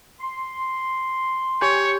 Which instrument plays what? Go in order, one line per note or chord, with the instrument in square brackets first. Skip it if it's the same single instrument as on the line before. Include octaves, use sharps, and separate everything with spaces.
[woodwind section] C6
[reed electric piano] G4 G#5 G6 [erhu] C#5